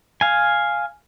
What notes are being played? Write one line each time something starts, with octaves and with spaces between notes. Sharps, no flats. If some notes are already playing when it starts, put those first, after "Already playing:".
F5 G#5